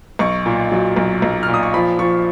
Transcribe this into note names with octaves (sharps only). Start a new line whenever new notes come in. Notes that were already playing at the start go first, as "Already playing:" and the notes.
B1 C#6
A#2
F#3
B1
B1
F6
A#2
D#6
C#6
F3 B5
F3 C#6